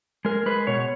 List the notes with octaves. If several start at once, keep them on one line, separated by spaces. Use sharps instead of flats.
G#3 A#4
G#3 B4
B2 C#5